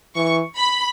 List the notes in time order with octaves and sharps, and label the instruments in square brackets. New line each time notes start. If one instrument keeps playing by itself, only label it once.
[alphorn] E3 [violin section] C#6
[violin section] B5